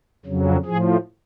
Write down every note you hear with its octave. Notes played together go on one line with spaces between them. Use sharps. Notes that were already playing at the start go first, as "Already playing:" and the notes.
F2 C#3 F#3
A2 F3 G#4